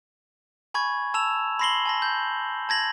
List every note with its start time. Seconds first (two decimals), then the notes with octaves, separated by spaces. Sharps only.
0.74 G#5 B5 C#6 G#6
1.14 A5 E6 E7 F7
1.59 B5 C6 A#6 C7 F#7 G7
1.86 G#5 A5 A#6
2.02 G6
2.69 A5 G#6 A#6 F#7